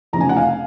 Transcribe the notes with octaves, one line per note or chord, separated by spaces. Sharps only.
F1 F2 C#3 A#5
G#5
F#5
F5 G#5